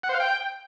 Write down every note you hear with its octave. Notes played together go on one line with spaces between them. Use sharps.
F#5
C5
F5
G5